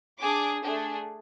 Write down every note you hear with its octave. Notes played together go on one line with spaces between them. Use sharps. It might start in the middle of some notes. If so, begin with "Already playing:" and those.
D4 G#4 D6
A3 D4 G#4